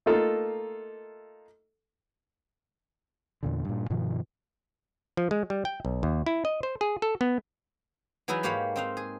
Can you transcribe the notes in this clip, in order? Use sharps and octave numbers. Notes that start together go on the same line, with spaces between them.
A3 A#3 D#4 F4 A4
E2 A#2 D3
G2 A#2
G2 B2 D#3 F3
F3
G#3
G3
G5
B1
D#2
E4
D#5
C5
G#4
A4
B3
E3 F#3 D#4 E4 G#4 B4
G#2 A#3 G4 C#5 F5 B5
C4 D#4 F5
G#4